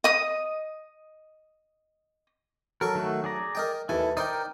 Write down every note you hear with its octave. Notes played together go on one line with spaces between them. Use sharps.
D#5 D#6
F#3 A4 A#4 C#6
D#3 A3 F#4
G#4 D5 A#5
A#4 D#5 G5
D#2 E3 E4 A4 G#5
D#4 A#4 C5 D5 D#5 G5